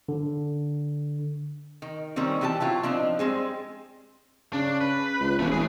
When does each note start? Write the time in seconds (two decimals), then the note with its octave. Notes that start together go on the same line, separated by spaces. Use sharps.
0.09 D3
1.82 D#3
2.16 D#3 G3 A#3 C4 C#4
2.41 E3 C4 G4 A#4 A5
2.60 A#2 F#3 E4 F4
2.83 F3 C4 D4 D#4
3.19 G3 G#3 C4 G#4
4.53 C#3 D4
4.81 B4
5.20 C#2
5.39 E1 A3 C#4
5.52 A1 E3 G#4